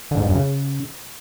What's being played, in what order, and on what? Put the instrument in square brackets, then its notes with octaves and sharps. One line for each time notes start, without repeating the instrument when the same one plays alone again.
[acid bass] D3
G#2
G2
F#2
C#3